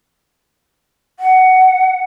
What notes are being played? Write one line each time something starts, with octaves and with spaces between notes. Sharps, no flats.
F#5